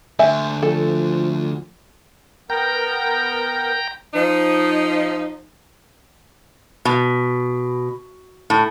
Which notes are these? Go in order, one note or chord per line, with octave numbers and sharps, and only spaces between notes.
D2 E5 G#5
F3 A4
B3 A#4 G5 A#5
F3 D#4
B2
A2